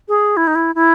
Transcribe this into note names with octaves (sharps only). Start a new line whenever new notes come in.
G#4
E4
D#4
E4
E4